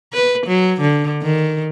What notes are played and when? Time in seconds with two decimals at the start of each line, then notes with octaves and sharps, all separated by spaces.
0.13 B4
0.47 F#3
0.81 D3
1.22 D#3